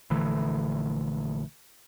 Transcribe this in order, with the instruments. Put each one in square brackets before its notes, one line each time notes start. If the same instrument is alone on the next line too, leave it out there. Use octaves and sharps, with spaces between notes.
[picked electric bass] A#1 D3 E3 A3